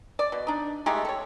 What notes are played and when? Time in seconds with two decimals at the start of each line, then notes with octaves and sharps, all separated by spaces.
0.19 D5
0.32 B2
0.47 D4 D#4
0.86 G#3 A3 D#4 G4
1.05 A4 C#5